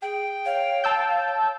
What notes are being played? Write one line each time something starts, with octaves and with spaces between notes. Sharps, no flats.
G#4 G5
C#5 F5
A5 E6 G6